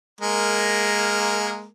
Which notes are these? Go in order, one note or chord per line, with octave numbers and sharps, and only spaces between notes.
G#3 A#3 A#4